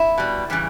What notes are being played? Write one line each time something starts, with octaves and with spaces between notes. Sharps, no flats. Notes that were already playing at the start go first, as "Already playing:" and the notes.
Already playing: E4
B2 G3
C#3 E3 G3